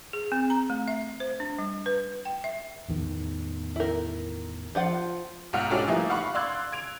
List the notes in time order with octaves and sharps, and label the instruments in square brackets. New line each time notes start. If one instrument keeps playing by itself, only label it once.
[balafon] G#4
C4
A#5
A3
E5
C5
D4
G3
B4
G5
E5
[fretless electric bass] A1 E2 D#3
[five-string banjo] E4 A#4
F3 F4 F#5
[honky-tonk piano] B1 G#2 F#5 F6
G#3 C#4 D4 F#4 G4 A4
E3 F3 G3 A3 A#3 D#4
F5 F#5 B5 C#6
D5 F5 C6 E6 F#6 G#6
G#6 D7 F7